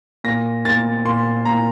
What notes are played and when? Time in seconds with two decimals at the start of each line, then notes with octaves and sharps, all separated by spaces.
0.24 A#2 A#6
0.65 A#2 A6
1.05 A#2 C6
1.45 A#2 A#5